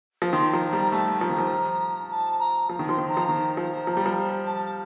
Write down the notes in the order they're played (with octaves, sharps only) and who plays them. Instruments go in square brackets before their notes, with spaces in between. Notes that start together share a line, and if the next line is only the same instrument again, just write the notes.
[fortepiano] F3
[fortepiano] D#3 [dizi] C6
[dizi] A5
[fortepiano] F3 [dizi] A#5
[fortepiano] G3 [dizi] A#5
[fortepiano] A3 [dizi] A5
[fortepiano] F3 [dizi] A#5
[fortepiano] D#3
F3
[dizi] A5
A#5
[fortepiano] F3
D#3
[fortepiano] F3 [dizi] C6
[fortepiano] D#3
[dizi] A#5
[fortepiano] F3
[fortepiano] D#3 [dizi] A#5
[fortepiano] F3
F3
G3
F3
[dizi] A5